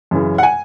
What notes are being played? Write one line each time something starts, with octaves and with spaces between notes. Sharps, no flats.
F#2 C#3 E3
F#5
G#5